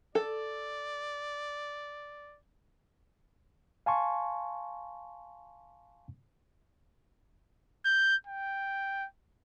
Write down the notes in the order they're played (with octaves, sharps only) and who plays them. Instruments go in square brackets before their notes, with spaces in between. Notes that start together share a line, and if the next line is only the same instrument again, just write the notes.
[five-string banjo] A4 [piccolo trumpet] D5
[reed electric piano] F5 G#5 A5 C6 C#6
[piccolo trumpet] G6
G5